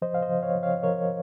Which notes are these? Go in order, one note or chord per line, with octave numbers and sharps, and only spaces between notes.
F3 C5 D#5
F5
C5 D#5
F3
C#5 F5
F3
C#5 F5
F3 A#4 C#5